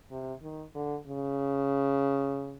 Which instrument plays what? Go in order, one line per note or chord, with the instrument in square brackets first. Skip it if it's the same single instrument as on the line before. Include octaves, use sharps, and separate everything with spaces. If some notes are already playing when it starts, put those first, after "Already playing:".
[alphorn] C3
D#3
D3
C#3